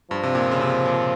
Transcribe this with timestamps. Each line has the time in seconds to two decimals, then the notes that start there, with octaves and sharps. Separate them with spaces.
0.10 G2 F3
0.23 C3
0.35 A#2
0.51 C#3
0.60 C3
0.86 A#2